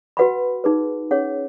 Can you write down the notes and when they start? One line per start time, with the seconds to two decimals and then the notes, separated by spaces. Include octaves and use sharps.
0.17 F#4 B4 F#5 B5
0.64 D#4 G#4 B4
1.11 C#4 G#4 C#5 F#5